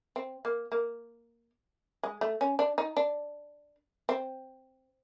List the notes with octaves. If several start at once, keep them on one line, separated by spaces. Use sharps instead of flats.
C4
A#3
A#3
G#3
A3
C#4
D4
D#4
D4
C4